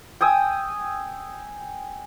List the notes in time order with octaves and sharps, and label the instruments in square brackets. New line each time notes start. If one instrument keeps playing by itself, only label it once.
[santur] G5 G#5 D#6 E6